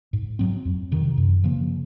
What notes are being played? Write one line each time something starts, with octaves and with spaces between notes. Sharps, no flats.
G#2
F#3 C4
F2
C3 D#3
F#2
C#3 F3 A#3